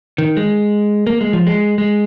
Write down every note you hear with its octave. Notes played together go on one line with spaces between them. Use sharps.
D#3
G#3
A#3
G#3
F3
G#3
G#3